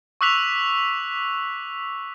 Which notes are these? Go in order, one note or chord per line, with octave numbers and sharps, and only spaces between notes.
C#6 D6 E6 F#6 B6 F7